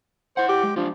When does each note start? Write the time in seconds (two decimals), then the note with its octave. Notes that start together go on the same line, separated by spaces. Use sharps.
0.37 E4 C5 F#5
0.49 G4
0.63 G#3
0.76 F3 D4 F4